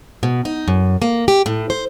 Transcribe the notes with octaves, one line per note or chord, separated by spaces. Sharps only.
B2
D#4
F#2
A#3
G4
A2
C5